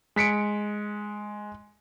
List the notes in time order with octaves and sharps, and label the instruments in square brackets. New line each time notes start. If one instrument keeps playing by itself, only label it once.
[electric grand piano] G#3 B6 C#7 D7